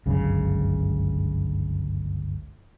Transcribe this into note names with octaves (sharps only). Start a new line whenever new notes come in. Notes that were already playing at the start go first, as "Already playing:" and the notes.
G1 C#2 F#2 C#3